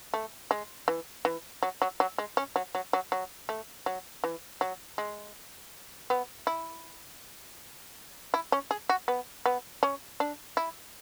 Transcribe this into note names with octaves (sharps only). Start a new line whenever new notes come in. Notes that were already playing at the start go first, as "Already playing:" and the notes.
A3
G#3
E3
E3
F#3
F#3
F#3
G#3
C#4
F#3
F#3
F#3
F#3
A3
F#3
E3
F#3
G#3
B3
E4
E4
C#4
G#4
F#4
B3
B3
C#4
D4
E4